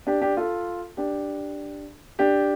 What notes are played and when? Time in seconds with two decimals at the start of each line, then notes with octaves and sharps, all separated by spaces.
0.07 D4 G4
0.21 D4 G4
0.37 F4 A4
0.97 D4 G4
2.19 D4 G4